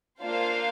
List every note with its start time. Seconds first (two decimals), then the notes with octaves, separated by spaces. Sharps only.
0.20 A#3 D4 F4 C5 F5